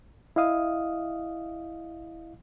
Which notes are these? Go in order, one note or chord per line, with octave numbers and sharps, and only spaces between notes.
E4 D#5 F5 D#6